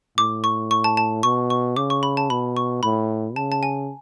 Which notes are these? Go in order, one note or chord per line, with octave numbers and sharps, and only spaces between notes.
A2 D6
C#6
C#6
A5
A5
B2 C#6
C#6
C#3 D6
C#6
B5
A5
B2 B5
C#6
A2 B5
C#3 A5
A5
G#5